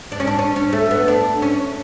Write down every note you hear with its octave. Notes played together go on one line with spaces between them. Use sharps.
D4
C#4
D4
C#4
C#4
A3
B3
D4
C#4